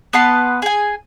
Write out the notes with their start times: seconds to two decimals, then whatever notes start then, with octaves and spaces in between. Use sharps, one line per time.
0.13 B3 B4 A5 C6
0.62 G#4 G#5